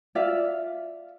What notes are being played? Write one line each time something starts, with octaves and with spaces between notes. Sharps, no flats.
F4 D5 E5 F5